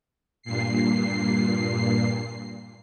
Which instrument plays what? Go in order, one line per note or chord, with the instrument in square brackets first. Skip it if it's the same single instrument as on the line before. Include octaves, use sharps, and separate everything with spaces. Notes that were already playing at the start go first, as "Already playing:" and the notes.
[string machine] G2 A#2 C7